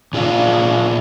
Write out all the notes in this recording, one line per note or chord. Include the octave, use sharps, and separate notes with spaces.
A#2 F4 G#4 D5 F5